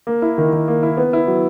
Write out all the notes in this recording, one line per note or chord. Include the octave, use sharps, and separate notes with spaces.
A#3
E4
D#3
D#3
A#3
E4
B3
E4
F#3